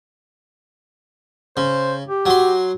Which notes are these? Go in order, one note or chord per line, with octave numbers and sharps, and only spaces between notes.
C#3 C5
G4
F#3 C6